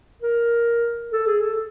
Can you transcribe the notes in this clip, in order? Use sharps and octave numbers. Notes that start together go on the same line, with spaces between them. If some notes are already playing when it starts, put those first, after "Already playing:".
A#4
A4
G#4
A4